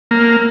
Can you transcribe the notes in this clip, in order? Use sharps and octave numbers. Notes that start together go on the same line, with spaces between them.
A#3